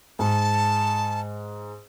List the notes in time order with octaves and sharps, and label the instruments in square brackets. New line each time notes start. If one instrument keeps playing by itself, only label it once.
[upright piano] G#2 [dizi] A5